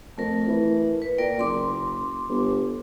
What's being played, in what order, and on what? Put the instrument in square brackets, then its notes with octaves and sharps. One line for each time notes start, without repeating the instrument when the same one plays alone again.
[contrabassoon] F2 [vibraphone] A3 A#4
[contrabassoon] E3
[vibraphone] B4
[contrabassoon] A#2 [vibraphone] A#4 D5 G5
[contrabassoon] F#1 [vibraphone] C6 D6
[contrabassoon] G1